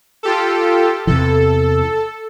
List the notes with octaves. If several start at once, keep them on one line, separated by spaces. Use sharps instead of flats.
F4 G4 A4
E2 C3 E3 A4